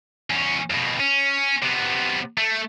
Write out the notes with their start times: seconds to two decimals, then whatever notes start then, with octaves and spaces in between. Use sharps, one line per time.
0.30 E2 C#4
0.70 F2 B2
1.00 C#4
1.62 C3 B3
2.38 A3